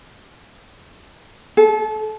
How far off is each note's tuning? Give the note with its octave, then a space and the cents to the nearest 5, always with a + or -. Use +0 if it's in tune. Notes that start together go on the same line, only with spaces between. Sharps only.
A4 -30